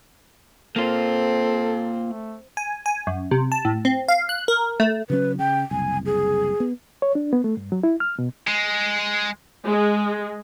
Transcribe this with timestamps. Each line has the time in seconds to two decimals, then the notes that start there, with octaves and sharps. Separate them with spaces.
0.76 A#3 C4 F4 A4
2.04 A3
2.57 G#5
2.86 G#5
3.07 F#2
3.31 C3
3.52 A5
3.65 A2
3.85 C4
4.08 F5
4.29 F#6
4.48 A#4
4.80 A3
5.10 C#3 F#3 C#4 B4
5.39 C#3 G5
5.71 F#1 C2 G#5
6.06 G#4
6.60 B3
7.02 C#5
7.15 D4
7.33 B3
7.44 A3
7.57 G2
7.72 F#3
7.83 E4
8.00 F6
8.19 B2
8.47 G#3
9.65 G#3